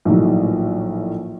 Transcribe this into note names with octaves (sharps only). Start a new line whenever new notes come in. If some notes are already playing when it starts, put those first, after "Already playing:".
A#1 A2 D#3 F#3